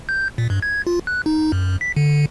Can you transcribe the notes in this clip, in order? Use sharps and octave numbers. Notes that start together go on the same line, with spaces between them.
G6
A#2
G2
G#6
F4
F#6
D#4
F#2
B6
D3